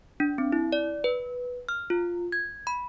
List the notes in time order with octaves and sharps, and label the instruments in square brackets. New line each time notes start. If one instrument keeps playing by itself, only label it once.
[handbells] D4
C4
E4
D5
B4
F6
F4
G#6
B5